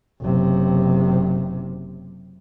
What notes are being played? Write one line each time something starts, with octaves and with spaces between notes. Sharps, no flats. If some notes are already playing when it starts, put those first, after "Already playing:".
F#1 C3